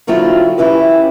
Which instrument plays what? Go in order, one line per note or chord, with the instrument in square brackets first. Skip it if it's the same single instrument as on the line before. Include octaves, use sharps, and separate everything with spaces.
[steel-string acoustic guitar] D3 F#3 C4 E4 F4
C#4 E4 G4 B4